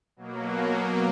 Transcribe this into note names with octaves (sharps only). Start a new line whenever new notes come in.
B2 F#3 A#3